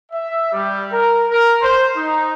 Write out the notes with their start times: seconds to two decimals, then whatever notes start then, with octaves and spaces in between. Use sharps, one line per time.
0.12 E5
0.52 G3
0.92 A#4
1.30 A#4
1.61 C5
1.96 D#4